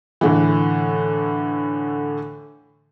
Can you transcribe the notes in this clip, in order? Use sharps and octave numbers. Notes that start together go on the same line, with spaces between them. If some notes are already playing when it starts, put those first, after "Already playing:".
A2 D3 E3